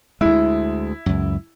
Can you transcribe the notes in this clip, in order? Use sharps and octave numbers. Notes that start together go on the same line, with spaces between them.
D2 G#3 E4
C#2 F#2